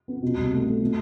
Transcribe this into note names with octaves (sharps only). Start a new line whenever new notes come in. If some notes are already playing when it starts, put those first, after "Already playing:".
B3
B2
C2
A3
A3
B2